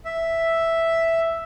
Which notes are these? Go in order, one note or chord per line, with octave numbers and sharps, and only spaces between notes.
E5